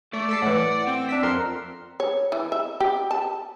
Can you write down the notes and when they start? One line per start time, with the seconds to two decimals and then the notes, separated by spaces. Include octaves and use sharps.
0.13 A3 A4 D5
0.29 A4 A5 A6 B6 C7
0.42 A2 E3 F#5
0.87 C4 G5
1.09 D4 E5 E6 B6
1.23 F2 A#4 F#5 C6
2.00 C#5
2.32 E3
2.52 E5
2.80 G4
3.11 A5